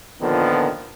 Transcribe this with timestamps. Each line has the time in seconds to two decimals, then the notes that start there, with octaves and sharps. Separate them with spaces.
0.21 A#2 D3 D#3 F3 B3